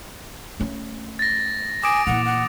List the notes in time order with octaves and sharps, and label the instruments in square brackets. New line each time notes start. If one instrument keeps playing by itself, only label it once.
[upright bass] A3 C#4
[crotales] A6 A#6
[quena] G#5 [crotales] D6 D#6 D7
[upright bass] A#2 E3 [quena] F#5 [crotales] D7 F7
[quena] F#5